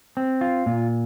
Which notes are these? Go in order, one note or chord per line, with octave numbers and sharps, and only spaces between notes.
C4
F4
A#2